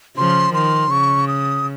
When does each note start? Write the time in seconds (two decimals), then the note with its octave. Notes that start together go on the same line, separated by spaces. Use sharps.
0.17 C#3 F3 C6
0.54 D#3 C6
0.91 C#3 C#6
1.28 D#6